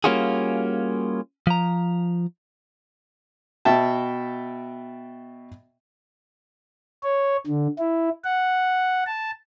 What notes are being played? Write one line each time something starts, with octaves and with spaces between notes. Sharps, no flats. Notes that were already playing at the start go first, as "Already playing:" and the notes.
G3 A#3 C#4 F4 F#4 G#4
F3 A#5
B2 E5 G5 A5
C#5
D3
E4
F#5
A5